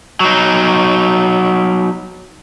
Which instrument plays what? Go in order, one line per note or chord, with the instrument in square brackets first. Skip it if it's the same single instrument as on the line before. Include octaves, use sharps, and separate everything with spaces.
[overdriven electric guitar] F#3 D#4